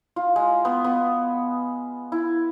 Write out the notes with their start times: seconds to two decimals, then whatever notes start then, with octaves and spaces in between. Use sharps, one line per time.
0.16 F4
0.36 G#3
0.65 B3
0.84 B3
2.12 E4